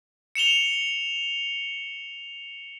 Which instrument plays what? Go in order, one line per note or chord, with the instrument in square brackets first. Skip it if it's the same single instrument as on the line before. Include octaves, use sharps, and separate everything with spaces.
[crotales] C#7 E7 F7 G7